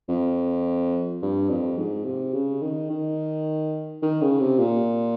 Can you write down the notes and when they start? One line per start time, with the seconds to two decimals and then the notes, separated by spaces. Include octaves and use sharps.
0.09 F2
1.22 G2
1.49 F2
1.78 G#2
2.05 C3
2.34 C#3
2.62 D#3
2.90 D#3
4.02 D#3
4.22 C#3
4.40 C3
4.59 A#2